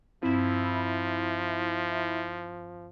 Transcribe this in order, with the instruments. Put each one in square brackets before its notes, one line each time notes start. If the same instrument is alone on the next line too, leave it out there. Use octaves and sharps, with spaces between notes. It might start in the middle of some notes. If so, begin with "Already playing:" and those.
[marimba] G2 C4 [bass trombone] F3 [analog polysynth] E4